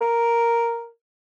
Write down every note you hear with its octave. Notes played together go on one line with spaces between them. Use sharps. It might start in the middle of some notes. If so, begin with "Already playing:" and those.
A#4